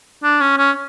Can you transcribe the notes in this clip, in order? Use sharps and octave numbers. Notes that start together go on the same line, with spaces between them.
D4
C#4
C#4